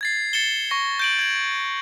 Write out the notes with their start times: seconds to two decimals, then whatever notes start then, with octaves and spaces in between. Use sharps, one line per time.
0.01 G#6 A6 C7
0.33 A6 C#7 E7 G7
0.71 C#6 A#6
0.99 G6 D7 F#7
1.19 G#6 F#7